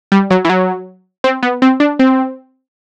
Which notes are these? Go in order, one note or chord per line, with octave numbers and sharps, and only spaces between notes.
G3
F#3
E3
F#3
C4
B3
C4
D4
C4